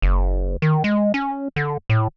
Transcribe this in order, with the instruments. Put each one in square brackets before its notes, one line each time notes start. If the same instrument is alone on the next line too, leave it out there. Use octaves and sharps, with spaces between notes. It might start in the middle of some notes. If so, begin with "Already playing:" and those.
[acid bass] F#1
D#3
G#3
C#4
D3
A2